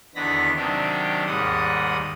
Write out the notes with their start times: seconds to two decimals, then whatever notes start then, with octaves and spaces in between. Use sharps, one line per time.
0.15 E2 D3 D#3 B3 B5 A#6
0.56 C3 D#3 F#3 D4 G4
1.26 D#2 G#2 G3 F#5 D#6